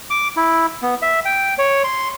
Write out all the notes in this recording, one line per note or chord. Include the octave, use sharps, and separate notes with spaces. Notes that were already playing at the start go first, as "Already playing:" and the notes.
D6
E4
B3
E5
G5
C#5
C6